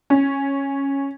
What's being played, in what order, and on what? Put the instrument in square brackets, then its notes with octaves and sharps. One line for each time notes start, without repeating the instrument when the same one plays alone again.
[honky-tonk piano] C#4